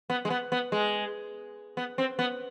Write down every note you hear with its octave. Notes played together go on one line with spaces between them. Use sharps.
B3
G#3
B3
B3
G#3
B3
C4
B3